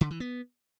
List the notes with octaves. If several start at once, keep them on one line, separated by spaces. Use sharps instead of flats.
D3
E3
B3